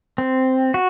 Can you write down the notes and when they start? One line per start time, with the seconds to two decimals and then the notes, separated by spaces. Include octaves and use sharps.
0.18 C4
0.74 F#4